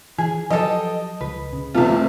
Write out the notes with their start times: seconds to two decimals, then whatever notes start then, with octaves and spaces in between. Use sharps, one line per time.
0.18 E3 G#4
0.51 F3 F#3 G4 A4 D#5
1.21 C#2 B4
1.53 C#3
1.74 E2 C3 F4 A4
1.90 A3 C4